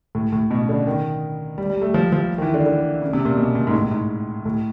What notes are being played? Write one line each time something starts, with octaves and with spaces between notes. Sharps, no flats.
A2
A2
B2
C#3
D3
D#3
G3
G3
A3
F3
F3
D#3
E3
D3
D3
C#3
C3
A#2
B2
A#2
G#2
A2
G#2
A2